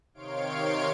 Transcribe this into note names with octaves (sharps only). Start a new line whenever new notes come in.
C3 D#3 C#5 F5 C6 D7